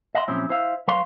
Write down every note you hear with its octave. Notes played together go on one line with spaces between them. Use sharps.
D#5 E5 F#5 G5 C6
A#2 F3 F#3 C4 C#4 E4
E4 C5 E5 F5
F#3 B4 C#5 F5 C6